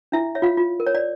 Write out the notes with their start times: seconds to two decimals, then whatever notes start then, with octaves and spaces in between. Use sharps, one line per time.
0.12 D4 E4 E5
0.35 C#5 E5
0.42 F4 F5
0.57 F4
0.80 A#4
0.87 C#5
0.95 D5